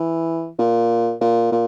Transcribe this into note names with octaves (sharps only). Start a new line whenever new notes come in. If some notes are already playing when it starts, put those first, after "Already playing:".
Already playing: E3
A#2
A#2
A#2